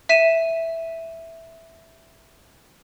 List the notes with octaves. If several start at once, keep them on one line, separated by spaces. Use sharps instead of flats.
E5 B6 D#7 E7